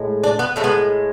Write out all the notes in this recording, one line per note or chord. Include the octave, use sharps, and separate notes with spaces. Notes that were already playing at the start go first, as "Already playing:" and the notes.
Already playing: A2 G#3
D4
B3
A2 G#3 A3
B3